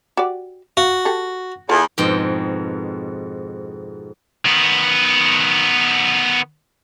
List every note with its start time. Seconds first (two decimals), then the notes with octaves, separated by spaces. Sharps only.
0.17 F#4 G4 D5
0.77 F#4 F5
1.05 G4 A4
1.69 E2 F4 A4 F5
1.98 F2 G#2 B2 G5
4.45 D#3 B3